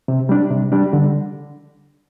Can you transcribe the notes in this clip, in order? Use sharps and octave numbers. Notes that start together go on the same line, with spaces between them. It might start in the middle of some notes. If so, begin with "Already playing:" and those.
C3
G3 D4
C3
G3 D4
D3